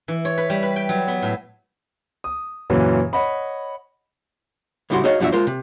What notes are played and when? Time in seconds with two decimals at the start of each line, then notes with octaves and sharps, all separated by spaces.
0.08 E3
0.25 C#5
0.38 B4
0.50 G3
0.63 B4
0.76 G5
0.89 F#3
1.08 B3
1.22 A2
2.24 D#6
2.70 F#2 A#2 C#3 E3 F#3
3.13 C#5 D#5 F#5 B5
4.90 A2 C#3 G3 E4 F#4 C6
5.04 D#4 F#4 G#4 C#5 D#5 F5
5.20 F#2 B2 F3 D4 F#4 E5
5.32 G#3 F4 A#4 C5
5.47 C3